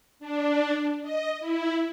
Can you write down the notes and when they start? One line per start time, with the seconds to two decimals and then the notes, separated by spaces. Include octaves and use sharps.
0.20 D4
1.02 D#5
1.39 E4